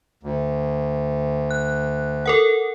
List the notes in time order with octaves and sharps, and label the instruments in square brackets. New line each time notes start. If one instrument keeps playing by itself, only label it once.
[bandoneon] D2
[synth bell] F#6
A4 A#4 F#5